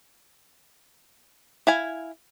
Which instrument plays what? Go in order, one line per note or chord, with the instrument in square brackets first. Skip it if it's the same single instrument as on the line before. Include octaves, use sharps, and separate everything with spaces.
[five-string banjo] E4 F5 G#5